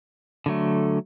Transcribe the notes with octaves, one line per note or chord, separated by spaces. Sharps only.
D3 F#3 A3